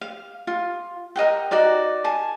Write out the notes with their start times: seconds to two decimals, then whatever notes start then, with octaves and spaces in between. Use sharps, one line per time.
0.01 F5
0.47 F4
1.16 A#4 D#5 F#5 G5
1.51 D#4 F#4 A#4 D5
2.04 G#5 A5